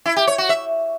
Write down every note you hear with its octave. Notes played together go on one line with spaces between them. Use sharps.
E4
G4
C#5
F#4
E5